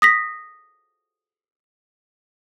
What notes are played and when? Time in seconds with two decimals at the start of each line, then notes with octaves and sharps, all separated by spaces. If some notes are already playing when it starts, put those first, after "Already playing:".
0.02 D#6 A#6 B6